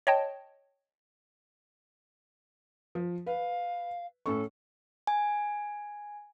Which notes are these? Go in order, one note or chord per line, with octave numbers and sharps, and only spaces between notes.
C#5 D#5 G5 A5
F3
B4 F5
A2 C#4 A4 C#6
G#5